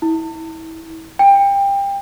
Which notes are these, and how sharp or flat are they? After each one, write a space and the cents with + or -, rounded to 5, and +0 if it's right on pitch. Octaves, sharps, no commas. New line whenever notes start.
E4 -30
G5 +25